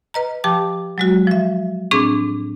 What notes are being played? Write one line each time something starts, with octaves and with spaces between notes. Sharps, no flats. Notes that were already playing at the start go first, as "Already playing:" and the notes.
B4 D#5 A#5
F3 G4 G5 A5 D6
F#3 G#3 F#4
F3 E5
A2 C4 D4 G#4 D6